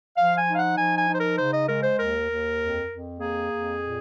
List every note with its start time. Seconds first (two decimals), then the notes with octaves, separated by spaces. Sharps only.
0.18 F3 F5
0.37 G#5
0.48 D#4
0.54 F5
0.58 F#5
0.78 F3 G#5
0.98 G#5
1.08 D#4 C5
1.19 A#4
1.39 C#3 C5
1.53 D#5
1.68 G#3 A#4
1.83 C5
1.99 D#2 A#4
2.29 D#2
2.59 F2
2.89 F2
3.19 A#3 G#4
3.50 F2
3.80 A#2